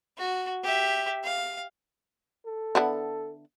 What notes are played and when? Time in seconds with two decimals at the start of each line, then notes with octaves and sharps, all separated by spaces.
0.18 F#4
0.63 G4 E5
1.24 F5
2.46 A4
2.75 D3 B3 E4